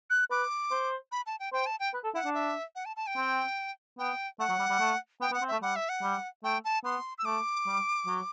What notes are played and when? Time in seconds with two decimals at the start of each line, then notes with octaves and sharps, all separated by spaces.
0.10 F#6
0.31 B4 D6
0.71 C5
1.12 B5
1.26 A5
1.40 G5
1.53 C5 G5
1.66 A5
1.80 G5
1.94 B4
2.04 A4
2.14 E4 F#5
2.25 D4
2.34 E5
2.75 F#5
2.85 A5
2.96 A5
3.07 G5
3.17 C4
3.99 B3 G5
4.39 A3 F#5
4.49 F#3
4.59 G3
4.70 G3
4.80 A3
5.21 B3 G5
5.31 B3
5.34 F#5
5.42 C4
5.48 A3 E5
5.62 G3 F#5
5.76 E5
5.89 F#5
6.03 G3
6.44 A3 G5
6.65 A5
6.84 B3 C6
7.18 E6
7.25 A3 D6
7.66 G3
8.07 F#3